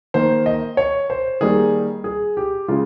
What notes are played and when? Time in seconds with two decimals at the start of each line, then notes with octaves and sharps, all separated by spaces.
0.14 D#3 A#3 C5
0.46 D#5
0.77 C#5
1.10 C5
1.41 D#3 G3 A#3 G#4
2.04 G#4
2.37 G4
2.68 C#3 G#3 F4